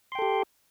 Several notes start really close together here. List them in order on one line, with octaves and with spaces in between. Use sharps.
C6 G5 A4 G4